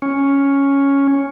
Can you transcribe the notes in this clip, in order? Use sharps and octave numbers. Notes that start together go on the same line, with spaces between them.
C#4